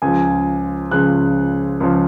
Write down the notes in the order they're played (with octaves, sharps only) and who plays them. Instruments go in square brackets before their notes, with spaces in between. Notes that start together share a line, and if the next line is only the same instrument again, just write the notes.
[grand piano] C#2 C#3 F3 G#5
C#2 C#3 F3 F#6
C#2 C#3 F3